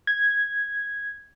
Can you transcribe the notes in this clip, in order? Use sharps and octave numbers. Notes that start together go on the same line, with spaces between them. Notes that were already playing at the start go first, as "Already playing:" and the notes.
G#6